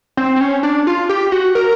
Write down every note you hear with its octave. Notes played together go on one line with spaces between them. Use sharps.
C4
C4
C#4
D4
F4
G4
F#4
A#4